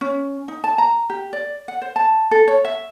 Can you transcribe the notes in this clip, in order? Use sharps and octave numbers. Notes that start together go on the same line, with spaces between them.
C#4
D#4
A5
A#5
G4
D5
F#5
C5
A5
A4
C#5
E5